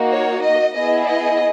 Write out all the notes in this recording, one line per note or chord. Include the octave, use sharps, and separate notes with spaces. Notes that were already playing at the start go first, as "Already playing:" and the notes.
Already playing: A#3 D#4 F#4
C#5
D#5
B3 E4 G#4 D#5
D#5